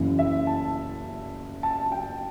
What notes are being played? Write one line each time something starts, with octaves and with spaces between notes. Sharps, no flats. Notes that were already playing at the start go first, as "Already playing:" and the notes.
Already playing: F#1 F#2 E3
E5
A5
A5
G5